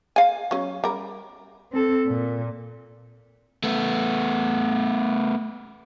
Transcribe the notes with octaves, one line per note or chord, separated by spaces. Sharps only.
F5 G#5
F#3 C#4
G3 A#4
C4 A4
A#2
A3 B3